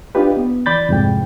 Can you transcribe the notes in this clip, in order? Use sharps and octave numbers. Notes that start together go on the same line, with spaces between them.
D4 D#4 F4 G4 B4
B3
E3 D5 B5 G6 A6
C2 F2 G#2 G5